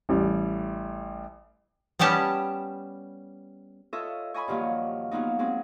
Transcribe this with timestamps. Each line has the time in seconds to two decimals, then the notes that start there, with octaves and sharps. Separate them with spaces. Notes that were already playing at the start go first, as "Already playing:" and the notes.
0.09 A1 G3
1.99 G3 B3 C#4 G4 A5
3.93 F4 A4 C#5 D#5 E5
4.34 C#5 D#5 G#5 B5 C#6
4.48 G2 D#3 F3 F#3 A#3 G4
5.11 F3 F#3 A#3 B3 D#4
5.39 F#3 G#3 C4